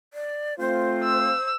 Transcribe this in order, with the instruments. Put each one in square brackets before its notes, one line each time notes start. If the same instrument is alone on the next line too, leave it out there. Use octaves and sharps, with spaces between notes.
[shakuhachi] D5
[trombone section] A3 C4 F4 [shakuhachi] C5
[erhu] E6